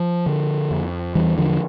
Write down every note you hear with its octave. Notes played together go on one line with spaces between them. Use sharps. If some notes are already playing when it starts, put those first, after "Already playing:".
Already playing: F3
D3
F2
E2 E3 G3
D3 F3